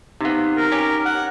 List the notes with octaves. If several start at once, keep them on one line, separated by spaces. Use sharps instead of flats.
C3 B3 D#4 F5
A#4
C#4 G4
F#5